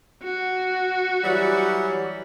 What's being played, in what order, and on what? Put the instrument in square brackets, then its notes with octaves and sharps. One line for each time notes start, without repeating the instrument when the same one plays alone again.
[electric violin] F#4
[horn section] E3 F#3 G3